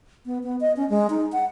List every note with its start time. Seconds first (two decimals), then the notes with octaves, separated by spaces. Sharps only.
0.26 B3
0.43 B3
0.61 D#5
0.77 C#4
0.90 G#3
1.10 D#4
1.32 F#5